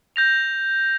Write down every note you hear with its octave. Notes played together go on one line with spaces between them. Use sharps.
G6 A#6 F7